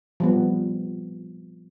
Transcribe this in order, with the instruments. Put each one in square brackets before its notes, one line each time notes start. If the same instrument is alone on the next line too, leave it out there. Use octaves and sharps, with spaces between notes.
[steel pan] F3 G3 B3